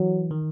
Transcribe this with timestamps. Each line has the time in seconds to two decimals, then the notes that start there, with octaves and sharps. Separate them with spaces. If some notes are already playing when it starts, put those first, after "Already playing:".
Already playing: E3 F#3
0.31 D#3